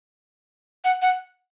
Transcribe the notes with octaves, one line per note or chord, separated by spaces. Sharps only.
F#5
F#5